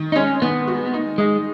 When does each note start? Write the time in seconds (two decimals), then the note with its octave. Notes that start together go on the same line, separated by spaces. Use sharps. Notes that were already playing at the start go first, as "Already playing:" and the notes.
Already playing: D#3
0.12 D#4
0.16 G#3 C#4
0.42 D#3 B3
0.67 F#4
0.94 D#4
1.18 G#3 D#4